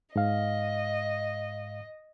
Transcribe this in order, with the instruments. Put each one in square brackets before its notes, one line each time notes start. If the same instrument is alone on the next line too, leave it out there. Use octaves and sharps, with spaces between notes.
[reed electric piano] G#2 F5 [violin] D#5